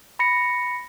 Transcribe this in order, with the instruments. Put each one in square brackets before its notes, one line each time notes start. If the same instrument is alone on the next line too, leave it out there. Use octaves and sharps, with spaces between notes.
[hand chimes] B5 A#6 C#7